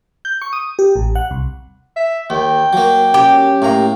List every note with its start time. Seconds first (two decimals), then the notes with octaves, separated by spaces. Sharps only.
0.25 G6
0.42 C#6
0.53 D#6
0.79 G4
0.96 A1
1.15 F#5
1.31 C2
1.96 E5
2.30 D#2 G5
2.73 F#3 A#3
3.14 C#4 G4
3.62 A2 A#3 A#5